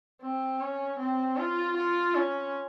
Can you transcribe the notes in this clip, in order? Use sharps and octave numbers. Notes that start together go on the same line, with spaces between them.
C4
C#4
C4
F4
F4
C#4